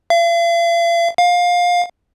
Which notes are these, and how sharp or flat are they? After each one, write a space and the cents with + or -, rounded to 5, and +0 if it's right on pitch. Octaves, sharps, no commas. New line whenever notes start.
F5 -45
F5 +20